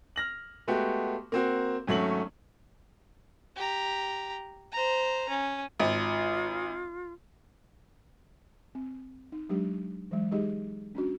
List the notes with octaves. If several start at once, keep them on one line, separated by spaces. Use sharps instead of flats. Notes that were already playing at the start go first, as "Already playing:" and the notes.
F6 A#6 F#7
G#3 A3 B3 F#4 G4
A#3 C4 F#4
G#1 F#3 A3 C#4 F#7
G4 A#5
C5 A#5
C#4
G#1 F4
C4
D#4
F#3 G#3 D4 G4
E3 F#3 G#3
G#3 D#4 G4 G#4 D#5
C#4 D4 F#4